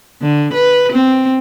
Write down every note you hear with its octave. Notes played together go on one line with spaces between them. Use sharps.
D3
B4
C4